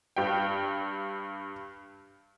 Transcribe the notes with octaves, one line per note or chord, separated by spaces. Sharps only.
G2 G5